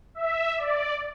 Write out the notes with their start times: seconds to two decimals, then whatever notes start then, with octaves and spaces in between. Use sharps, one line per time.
0.15 E5
0.57 D5